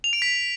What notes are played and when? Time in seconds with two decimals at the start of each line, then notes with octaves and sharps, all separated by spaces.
0.04 F7
0.13 D7
0.22 B6